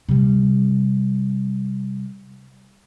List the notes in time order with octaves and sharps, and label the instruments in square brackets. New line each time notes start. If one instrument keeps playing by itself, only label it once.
[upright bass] C3 G3